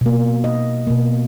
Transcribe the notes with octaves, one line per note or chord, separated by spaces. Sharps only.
B2 A#3
D#5
B2 A#3